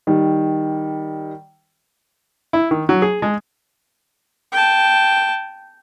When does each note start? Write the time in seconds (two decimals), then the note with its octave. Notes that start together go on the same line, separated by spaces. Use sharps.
0.07 D#3 G3
2.53 E4
2.71 D#3
2.89 F#3
3.02 G#4
3.22 G#3
4.52 G5 A5